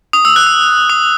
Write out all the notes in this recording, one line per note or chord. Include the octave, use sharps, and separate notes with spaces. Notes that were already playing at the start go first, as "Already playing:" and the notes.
D#6
E6
F#6
E6
D#6